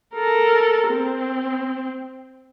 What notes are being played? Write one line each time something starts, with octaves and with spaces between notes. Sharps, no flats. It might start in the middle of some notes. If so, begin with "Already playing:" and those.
A4 A#4
C4